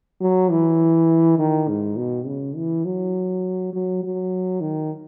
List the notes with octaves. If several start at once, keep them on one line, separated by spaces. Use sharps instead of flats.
F#3
E3
D#3
G#2
B2
C#3
E3
F#3
F#3
F#3
D#3